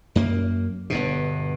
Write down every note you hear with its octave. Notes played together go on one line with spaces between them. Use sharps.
F#2 A#3
G1 G2 B2